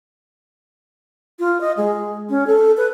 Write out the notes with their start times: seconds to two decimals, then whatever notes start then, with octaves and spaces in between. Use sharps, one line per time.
1.39 F4
1.61 D#5
1.77 G#3
2.29 C#4
2.47 A4
2.77 B4